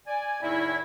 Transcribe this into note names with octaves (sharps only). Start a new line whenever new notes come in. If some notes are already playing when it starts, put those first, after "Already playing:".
D5 G#5
E2 A2 D#3 D#4 E4